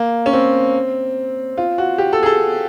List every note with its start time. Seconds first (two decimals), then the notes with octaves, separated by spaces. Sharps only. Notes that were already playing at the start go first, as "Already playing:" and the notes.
Already playing: A#3
0.26 C#4
0.33 C4
1.58 F4
1.78 F#4
1.98 G4
2.13 A4
2.23 G#4
2.26 A4